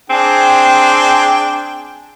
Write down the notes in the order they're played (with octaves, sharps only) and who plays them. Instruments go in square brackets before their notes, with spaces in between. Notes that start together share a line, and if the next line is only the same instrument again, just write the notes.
[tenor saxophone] C4 [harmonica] D4 G#4 G5